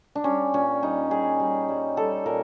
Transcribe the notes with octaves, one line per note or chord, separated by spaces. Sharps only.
D4
G3 C#4
A#2 C#4
G3 D#4
G3 G#4
G3
G3
G3 A4
A#2 A#4